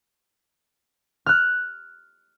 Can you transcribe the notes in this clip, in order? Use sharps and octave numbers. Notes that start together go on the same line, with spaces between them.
F6 F#6